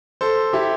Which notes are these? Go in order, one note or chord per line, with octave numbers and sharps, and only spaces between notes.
A4 C5
E4 G4